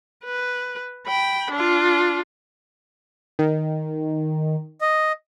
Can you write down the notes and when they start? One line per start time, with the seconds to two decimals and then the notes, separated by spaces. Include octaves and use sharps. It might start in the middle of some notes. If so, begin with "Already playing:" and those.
0.25 B4
1.07 G5 B5
1.51 D4 F4
3.39 D#3
4.81 D#5